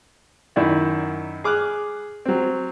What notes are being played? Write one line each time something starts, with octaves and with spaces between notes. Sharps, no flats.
F#2 D#3 E4 D5 E5
G#4 D6 F6 F#6
F#3 C4